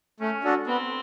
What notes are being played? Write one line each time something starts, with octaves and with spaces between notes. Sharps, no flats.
A3 C#4
D4 F#4 A4
B3 C4